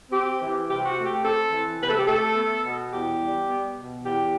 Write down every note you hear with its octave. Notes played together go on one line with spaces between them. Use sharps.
C4 G4
E3
C3 G4
F#4
A3
G4
C4 A4
E3
C3 B4
A4
G4
A3 A4
B3
B2
E2 G4
G3
B3
B2
E2 G4